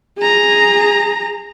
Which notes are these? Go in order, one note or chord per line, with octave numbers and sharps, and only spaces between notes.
G#4 A#5